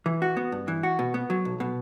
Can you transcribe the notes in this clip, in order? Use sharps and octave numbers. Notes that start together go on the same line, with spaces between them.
E3
F#4
B3
G2
E3
F#4
B2
B3
F#3
B1
B2